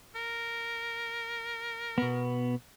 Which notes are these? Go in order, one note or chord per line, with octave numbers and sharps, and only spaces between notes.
A#4
B2 B3